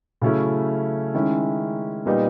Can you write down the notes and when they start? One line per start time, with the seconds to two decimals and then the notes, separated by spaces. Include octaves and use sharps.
0.21 C#3 F#3 A3 C#4 E4
1.14 D#3 G#3 C#4 E4
2.06 A#2 G3 B3 D#4